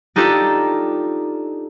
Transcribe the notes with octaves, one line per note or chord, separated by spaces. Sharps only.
D4 D#4 F4 G4 A4